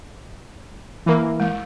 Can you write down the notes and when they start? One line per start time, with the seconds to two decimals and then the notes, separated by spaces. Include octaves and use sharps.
1.06 E3 A#3
1.40 G#3